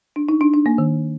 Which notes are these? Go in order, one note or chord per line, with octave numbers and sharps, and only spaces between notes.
D4
D#4
D4
D4
A#3
D#3